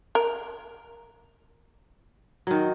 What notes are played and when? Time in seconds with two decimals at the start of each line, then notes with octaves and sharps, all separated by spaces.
0.15 A#4
2.47 D#3 F#3